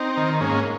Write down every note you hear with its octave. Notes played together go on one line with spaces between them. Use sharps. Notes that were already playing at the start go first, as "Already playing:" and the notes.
Already playing: C4 D#4
D#3
G#2 A#3 C#4